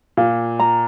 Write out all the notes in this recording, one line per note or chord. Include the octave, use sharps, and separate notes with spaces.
A#2 F5
A#5